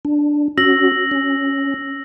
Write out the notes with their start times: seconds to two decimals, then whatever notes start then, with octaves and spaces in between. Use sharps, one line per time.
0.05 D4
0.57 C#4 F#4 E6 A#6 F#7
1.11 C#4